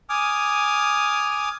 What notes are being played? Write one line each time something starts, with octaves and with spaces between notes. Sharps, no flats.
G#5 D6 D#6 F6